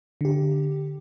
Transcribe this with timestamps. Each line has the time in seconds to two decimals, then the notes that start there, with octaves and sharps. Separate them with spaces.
0.21 D3 G4